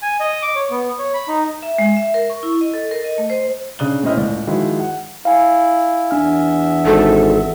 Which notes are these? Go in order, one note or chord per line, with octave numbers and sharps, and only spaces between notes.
G#5
D#5
D6
C#5
B3
C#5
B5
D#4
E5
G#3
E5
A#4
C#6
E4
D#5
A4
A#4
D#5
A3
C5
C#3 D4 D#6 F#6 G7
A2 C4 C#4 E4 D#5 F6
C#2 A2 D5
D#3 F3 G#3 E4 F#4 G#4
F#5
E4 F5 G#5
E2 D4 E5 G#5 F6
G#1 A4